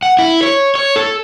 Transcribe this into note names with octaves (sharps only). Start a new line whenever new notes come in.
F#5
E4
C#5
C#5
A4